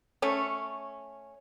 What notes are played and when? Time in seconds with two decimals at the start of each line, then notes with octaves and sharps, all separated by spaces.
0.22 A3 C#4